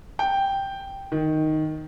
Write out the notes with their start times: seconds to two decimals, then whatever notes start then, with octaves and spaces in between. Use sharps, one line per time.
0.19 G5
1.12 D#3